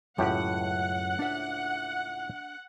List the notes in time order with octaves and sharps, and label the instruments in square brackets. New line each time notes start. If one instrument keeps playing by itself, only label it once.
[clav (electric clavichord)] C#2 A2 G4 [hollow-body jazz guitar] F#2 F#4 [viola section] F#5
[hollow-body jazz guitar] D4 E5